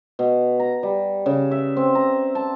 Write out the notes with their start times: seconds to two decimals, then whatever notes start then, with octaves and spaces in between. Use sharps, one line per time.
0.19 B2
0.60 A#5
0.83 G3
1.26 C#3
1.51 E5
1.77 C4
1.95 A#5
2.35 A5